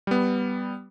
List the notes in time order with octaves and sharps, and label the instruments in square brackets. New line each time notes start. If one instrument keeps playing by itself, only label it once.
[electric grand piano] G3 B3